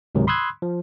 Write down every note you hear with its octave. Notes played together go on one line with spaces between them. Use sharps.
C#2 G#2 C3 D#3 F#3
B5 C6 D#6 E6 F#6 G#6
F3